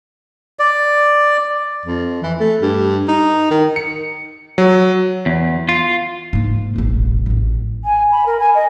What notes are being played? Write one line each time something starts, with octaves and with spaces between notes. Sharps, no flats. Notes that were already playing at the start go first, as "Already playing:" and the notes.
D5
F2
E3
A3
G2
D#4
D#3
C#7
F#3
E2
F4
G#2 A#3
E1 A1
A1 A2
G#5
B5
A#4
G#5
D#5